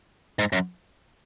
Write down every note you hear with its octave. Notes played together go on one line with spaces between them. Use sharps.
G#2
F#2